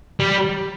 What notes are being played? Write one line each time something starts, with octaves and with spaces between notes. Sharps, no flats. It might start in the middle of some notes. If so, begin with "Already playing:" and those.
G3